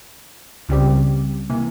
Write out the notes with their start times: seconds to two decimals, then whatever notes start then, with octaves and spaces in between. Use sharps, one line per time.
0.69 C#2 C#3 G3 C4 G4
1.50 C3 E3 A#3